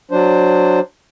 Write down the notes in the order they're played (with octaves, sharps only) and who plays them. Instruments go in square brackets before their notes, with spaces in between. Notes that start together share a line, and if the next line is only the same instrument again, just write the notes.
[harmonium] F#3 D4 C5